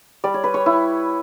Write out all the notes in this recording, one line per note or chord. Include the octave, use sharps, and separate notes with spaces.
G3 D5
C#5
B4
C#5
E4